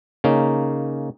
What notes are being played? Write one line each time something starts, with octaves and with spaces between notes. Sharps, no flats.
C#3 A#3 C#4 D#4